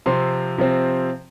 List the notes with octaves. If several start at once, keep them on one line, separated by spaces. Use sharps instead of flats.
C3 F3 C4 C6
C3 F3 C4